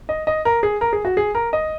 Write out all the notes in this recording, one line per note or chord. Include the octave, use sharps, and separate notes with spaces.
D#5
D#5
A#4
G#4
A#4
G#4
F#4
G#4
A#4
D#5